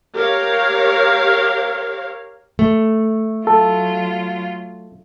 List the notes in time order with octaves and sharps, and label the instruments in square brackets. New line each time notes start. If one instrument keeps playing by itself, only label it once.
[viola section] G4 A#4 C#5 F5
[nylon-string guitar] A3
[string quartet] F#3 F4 [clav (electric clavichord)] A4